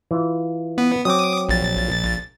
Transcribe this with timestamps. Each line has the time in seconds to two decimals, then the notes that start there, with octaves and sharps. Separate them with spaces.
0.11 E3 F4
0.78 B3
1.05 F#3 C4 D6 D#6
1.49 A#1 A6